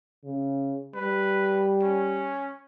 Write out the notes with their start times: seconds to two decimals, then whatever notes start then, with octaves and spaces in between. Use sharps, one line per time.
0.24 C#3
0.95 G3 B4
1.82 C#4